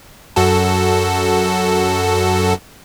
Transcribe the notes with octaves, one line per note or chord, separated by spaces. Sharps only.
F#2 F#4 A4